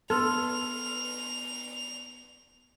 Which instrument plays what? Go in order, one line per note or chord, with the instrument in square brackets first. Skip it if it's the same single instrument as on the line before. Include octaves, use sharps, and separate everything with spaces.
[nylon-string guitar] B3 [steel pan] A4 [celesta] B4 C6 F6 [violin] F7